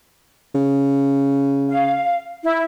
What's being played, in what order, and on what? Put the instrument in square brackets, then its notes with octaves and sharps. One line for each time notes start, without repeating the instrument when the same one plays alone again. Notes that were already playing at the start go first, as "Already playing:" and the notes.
[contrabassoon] C#3
[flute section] F5
E4